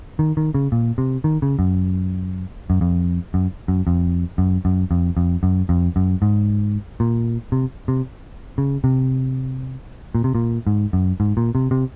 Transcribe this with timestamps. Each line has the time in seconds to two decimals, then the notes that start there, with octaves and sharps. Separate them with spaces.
0.19 D#3
0.37 D#3
0.54 C#3
0.72 A#2
0.98 C3
1.24 D#3
1.42 C#3
1.59 F#2
2.70 F#2
2.81 F2
3.34 F#2
3.68 F#2
3.87 F2
4.38 F#2
4.65 F#2
4.91 F2
5.17 F2
5.43 F#2
5.69 F2
5.96 F#2
6.22 G#2
7.00 A#2
7.52 C3
7.88 C3
8.58 C#3
8.84 C3
10.15 A#2
10.24 C3
10.35 A#2
10.67 G#2
10.93 F#2
11.20 G#2
11.37 A#2
11.55 C3
11.71 C3